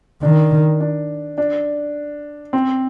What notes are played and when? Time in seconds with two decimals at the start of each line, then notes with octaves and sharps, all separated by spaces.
0.23 D#3 D4
0.81 D4
1.38 D4
2.53 C4